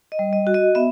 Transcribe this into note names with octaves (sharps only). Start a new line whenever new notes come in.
D#5
G3
D#5
F#4
D#5
B3 E5